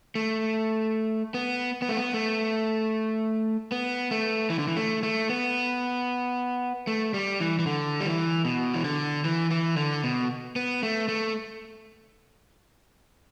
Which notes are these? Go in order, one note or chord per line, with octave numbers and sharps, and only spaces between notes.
A3
B3
B3
A3
B3
A3
B3
A3
E3
D3
E3
A3
A3
B3
A3
G3
E3
E3
D3
G3
E3
B2
E3
D3
E3
E3
D3
B2
B3
A3
A3